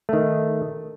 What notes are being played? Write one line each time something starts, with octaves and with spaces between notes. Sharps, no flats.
D#3 A3